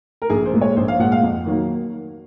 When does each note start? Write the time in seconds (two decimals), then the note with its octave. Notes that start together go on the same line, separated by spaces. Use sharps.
0.22 A#4
0.30 A#1 G#4
0.46 C5
0.53 A#2 G#3
0.61 C#5
0.77 A#1 C5
0.88 F5
0.99 A#2 G#3 F#5
1.12 F5
1.23 F2
1.46 D#3 F#3 A#3